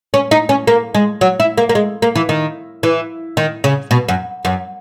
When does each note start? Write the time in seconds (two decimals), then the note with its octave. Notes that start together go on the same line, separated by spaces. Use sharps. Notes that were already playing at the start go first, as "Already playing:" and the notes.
0.14 C#4
0.31 D#4
0.49 C#4
0.67 A#3
0.95 G#3
1.21 F#3
1.40 E4
1.58 A#3
1.69 A#3
1.75 G#3
2.02 A#3
2.15 E3
2.29 D#3
2.83 E3
3.37 D#3
3.64 C#3
3.91 B2
4.09 F#2
4.45 F#2